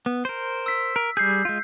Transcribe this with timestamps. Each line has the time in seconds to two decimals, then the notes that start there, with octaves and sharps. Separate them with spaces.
0.06 B3
0.25 A#4 C5
0.66 E6 B6
0.96 A#4
1.17 G3 G#4 G6 C7
1.45 G#3 F4